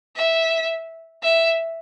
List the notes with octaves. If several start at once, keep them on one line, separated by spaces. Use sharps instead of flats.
E5
E5